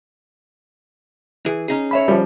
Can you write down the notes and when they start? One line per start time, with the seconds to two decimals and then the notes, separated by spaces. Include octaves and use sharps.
1.46 E3 G#4
1.68 C#4 D#4 G#4
1.91 C#5 E5 B5
2.08 F3 G3